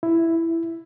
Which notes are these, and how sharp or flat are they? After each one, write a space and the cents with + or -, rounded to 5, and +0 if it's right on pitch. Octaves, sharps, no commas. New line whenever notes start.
E4 +5